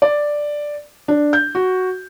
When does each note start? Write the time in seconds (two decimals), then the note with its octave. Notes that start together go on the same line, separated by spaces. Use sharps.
0.02 D5
1.08 D4
1.33 G6
1.55 F#4